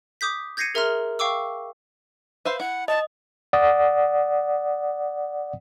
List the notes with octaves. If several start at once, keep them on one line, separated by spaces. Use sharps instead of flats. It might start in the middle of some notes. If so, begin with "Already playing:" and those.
D6 D#6 G6 B6
G6 G#6 A#6 C7 C#7 D#7
G#4 A#4 E5 A#5 C6 F6
F5 G5 C#6 D6 E6
B4 C5 E5 F5
E4 F#5
D#5 A5
D5 F#5 D#6